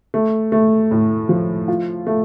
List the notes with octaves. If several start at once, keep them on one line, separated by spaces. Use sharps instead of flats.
A3
A3
A2
F3
F4
A3